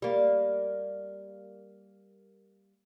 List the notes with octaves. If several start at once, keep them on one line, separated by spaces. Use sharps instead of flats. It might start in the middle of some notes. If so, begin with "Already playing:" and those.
G3 A#3